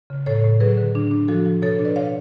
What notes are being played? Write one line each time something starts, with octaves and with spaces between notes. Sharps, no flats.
C#3
A2 A4 C#5
A2
F#3 G#4 B4
D3
D4
D4
F3 F#4 A4
F3
B2 A4 C#5
D4
B4 D5
C#5 F5